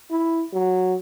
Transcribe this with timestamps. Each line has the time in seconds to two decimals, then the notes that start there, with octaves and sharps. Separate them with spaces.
0.11 E4
0.53 F#3